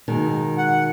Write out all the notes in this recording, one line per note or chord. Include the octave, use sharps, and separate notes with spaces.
B2 D#3 G#3
F#5